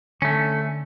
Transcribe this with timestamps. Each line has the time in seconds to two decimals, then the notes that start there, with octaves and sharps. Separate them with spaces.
0.22 D3 A3 C#4